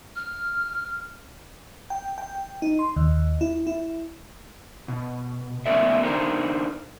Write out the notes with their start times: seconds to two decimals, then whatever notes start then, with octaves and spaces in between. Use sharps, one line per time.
0.16 F6
1.90 G5
2.18 G5
2.62 D#4
2.79 C6
2.96 D#2
3.41 E4
3.67 E4
4.88 B2
5.66 A3 B3 C#4 A#4 D5 E5
6.03 D4 D#4 A#4 C5